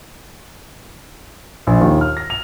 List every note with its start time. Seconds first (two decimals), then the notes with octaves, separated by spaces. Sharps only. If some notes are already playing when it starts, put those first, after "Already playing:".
1.67 A#1
1.81 D#2
2.01 F6
2.17 A#6
2.30 F7